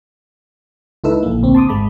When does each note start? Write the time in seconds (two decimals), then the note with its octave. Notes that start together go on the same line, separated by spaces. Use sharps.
1.04 C#2 D#4 E4 A4 B4 E6
1.23 A#1 A#3
1.43 D2 C4
1.55 A5 C6 D6 D#6
1.69 G#1 G#3 A5 B5